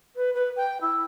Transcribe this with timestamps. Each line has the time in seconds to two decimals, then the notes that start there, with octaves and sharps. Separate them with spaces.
0.15 B4
0.33 B4
0.56 G5
0.81 E4